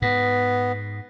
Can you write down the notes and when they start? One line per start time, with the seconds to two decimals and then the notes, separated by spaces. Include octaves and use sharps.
0.02 G#2 B3